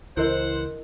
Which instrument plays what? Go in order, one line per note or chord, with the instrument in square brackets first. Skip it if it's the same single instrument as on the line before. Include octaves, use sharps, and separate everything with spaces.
[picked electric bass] C#2 E3 [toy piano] E4 A#4 D#5 [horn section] C5 [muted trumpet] F#5